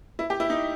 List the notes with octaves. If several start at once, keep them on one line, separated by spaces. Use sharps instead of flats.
E4
G4
E4
D#4